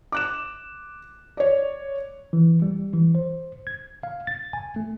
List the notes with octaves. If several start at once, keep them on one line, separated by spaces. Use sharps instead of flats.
D6 F#6 E7
C#5 D5
E3
G3
E3
C5
G#6
F5
A6
G#5
A3